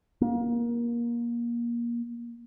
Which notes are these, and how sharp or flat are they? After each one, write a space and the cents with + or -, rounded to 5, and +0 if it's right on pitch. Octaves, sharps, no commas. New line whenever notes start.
A#3 +25